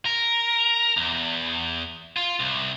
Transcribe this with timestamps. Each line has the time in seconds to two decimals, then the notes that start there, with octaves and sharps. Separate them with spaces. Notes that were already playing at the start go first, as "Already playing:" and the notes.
0.05 A#4
0.97 E2
2.17 F4
2.40 C2